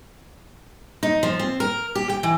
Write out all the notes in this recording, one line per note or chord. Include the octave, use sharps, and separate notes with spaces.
D#4
F3
C4
A#4
G4
G5
E3